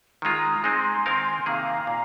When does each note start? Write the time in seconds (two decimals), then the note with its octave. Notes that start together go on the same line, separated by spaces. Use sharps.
0.22 D#3 G#3 F4 A#5 D#6
0.64 G#3 C4 D#4 G#5 C6
1.06 D#3 C4 D#4 A#4 F5
1.46 C3 D#3 A#3 G#4 F5 A#5
1.87 A#2